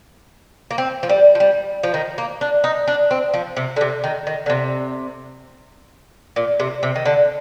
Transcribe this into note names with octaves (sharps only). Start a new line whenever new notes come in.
A#3
C4
F3
G3
F3
G3
F3
D#3
A#3
D4
D#4
D4
C4
F3
C3
D3
C3
D#3
D#3
D3
C3
A#2
C3
C3
D#3
D3